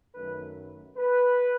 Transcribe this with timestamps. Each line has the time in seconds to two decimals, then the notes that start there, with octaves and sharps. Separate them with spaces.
0.14 F#2 D#3 A3 B4
0.97 B4